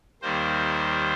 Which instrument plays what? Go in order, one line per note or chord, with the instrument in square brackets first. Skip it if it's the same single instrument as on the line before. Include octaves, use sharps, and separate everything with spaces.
[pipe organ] D#2 D#3 G3 A#3 C5